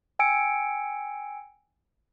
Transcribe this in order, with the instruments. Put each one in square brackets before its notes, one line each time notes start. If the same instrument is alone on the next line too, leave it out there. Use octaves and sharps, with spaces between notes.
[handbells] G5 G#5 E6 C#7 D7